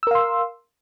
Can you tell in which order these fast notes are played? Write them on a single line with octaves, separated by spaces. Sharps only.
E6 A#4 F5 C6